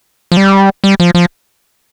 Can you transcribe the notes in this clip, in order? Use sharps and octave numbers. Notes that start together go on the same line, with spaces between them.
F3
G3
G3
F3
F3